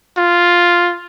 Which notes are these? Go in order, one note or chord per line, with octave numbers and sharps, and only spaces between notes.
F4